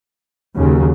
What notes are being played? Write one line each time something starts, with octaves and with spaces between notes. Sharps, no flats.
D#2 C#3 F#3